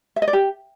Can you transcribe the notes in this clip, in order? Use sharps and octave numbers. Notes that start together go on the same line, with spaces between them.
E5
D#5
D5
G4